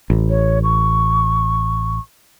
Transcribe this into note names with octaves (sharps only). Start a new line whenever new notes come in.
A1
C#5
C#6